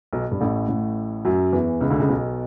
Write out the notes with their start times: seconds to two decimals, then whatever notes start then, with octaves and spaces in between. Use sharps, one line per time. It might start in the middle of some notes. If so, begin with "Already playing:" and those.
0.13 B1 B2
0.31 G2
0.41 A1 A2
0.68 A1 A2
1.25 F#2 F#3
1.53 E2 E3
1.81 C#2 C#3
1.90 D2 D3
2.00 C#2 C#3
2.09 B1 B2